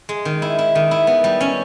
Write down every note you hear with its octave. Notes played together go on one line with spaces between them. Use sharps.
G#3
D#3
E4
E4
D#3
E4
B3
G3
C#4